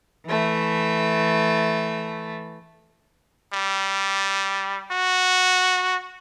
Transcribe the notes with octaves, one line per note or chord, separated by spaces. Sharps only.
E3 A3
G3
F#4